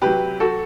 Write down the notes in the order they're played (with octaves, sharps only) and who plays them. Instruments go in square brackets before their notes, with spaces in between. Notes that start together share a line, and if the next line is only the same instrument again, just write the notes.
[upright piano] C3 F#3 G4 B4
F#4 A4